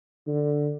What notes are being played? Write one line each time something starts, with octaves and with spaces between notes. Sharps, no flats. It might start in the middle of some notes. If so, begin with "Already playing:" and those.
D3